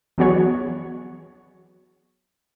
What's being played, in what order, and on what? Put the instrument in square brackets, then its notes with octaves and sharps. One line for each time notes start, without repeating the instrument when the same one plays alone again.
[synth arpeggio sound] E3 F#3 B3 F#4 G#4 C#5